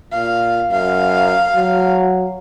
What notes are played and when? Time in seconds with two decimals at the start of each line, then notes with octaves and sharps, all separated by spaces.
0.12 A#2 F5
0.71 F#2 F5
1.56 F#3